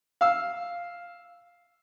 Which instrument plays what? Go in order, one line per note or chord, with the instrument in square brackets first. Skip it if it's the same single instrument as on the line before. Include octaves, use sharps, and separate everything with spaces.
[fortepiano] F5 E6